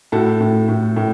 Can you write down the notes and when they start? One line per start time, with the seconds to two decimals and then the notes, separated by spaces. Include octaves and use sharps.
0.12 A2 F#4 A4
0.40 A2
0.68 A2
0.96 A2